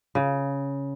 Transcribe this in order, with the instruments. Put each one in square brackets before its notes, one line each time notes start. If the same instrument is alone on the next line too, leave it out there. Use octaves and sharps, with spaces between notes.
[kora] C#3